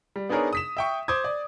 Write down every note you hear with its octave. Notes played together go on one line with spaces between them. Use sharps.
G3
B3 D4 D#4 G#4 A#4 C#5
D#6 B6 E7
E5 G5 C#6
C5 D6 D#6 G#6
D5